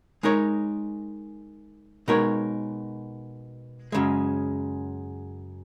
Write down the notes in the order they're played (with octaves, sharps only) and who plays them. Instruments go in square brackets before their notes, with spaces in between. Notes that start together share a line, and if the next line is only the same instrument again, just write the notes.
[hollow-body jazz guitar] G#3 D#4 A#4 C#5
B2 G#3 D#4 A#4 C#5
F#2 C#3 G#3